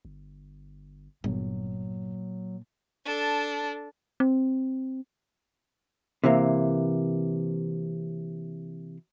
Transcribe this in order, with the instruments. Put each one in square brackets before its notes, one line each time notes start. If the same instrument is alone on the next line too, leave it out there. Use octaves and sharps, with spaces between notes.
[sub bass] G1
[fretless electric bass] G1 [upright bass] A#2 [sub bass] F#3
[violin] D4 A4
[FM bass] C4
[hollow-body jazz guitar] C3 E3 A#3